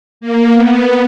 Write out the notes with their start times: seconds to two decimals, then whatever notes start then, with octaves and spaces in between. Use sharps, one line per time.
0.21 A#3
0.52 B3